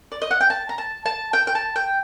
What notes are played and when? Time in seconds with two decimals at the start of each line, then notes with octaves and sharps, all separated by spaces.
0.12 D5
0.22 D#5
0.31 F#5
0.40 G5
0.50 A5
0.69 A#5
0.78 A5
1.06 A5
1.33 G5
1.47 G5
1.55 A5
1.76 G5